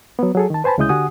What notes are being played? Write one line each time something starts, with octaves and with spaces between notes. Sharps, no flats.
F#3 B3
F#3 G#4 A4
D#3 A5
B4 C5 G#5 A5 B5
D2 C#3 G#3 E4 D#6 G6
D3 F#4 G4 F#5 G#5 D#6